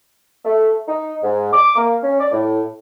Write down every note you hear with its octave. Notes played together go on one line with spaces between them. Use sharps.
A3
D#4
G#2
D6
A#3
C#4
D5
A2